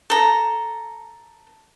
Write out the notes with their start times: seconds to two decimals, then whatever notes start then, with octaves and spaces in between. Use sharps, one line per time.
0.10 A4 A#5